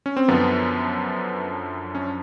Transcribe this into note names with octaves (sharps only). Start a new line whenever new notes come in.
C#4
C4
F#2 D3 F3 B3
C#4